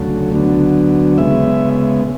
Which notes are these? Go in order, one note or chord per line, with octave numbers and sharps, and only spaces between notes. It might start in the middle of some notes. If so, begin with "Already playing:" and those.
Already playing: D2 C#3 F#3 A3
D2 D3 F#3 B3
C#3 G#3 B3 E5